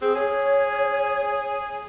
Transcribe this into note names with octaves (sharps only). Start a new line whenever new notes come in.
C4 G#4
G#4 C#5